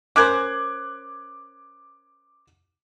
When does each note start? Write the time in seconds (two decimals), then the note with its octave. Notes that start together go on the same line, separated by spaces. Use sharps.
0.16 C#4 A#4 C5 D6 F#6 G#6